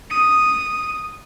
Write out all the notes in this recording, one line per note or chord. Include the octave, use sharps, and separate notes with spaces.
D#6